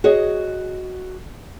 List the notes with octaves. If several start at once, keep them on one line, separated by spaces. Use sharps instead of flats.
F#4 G#4 C#5 D#5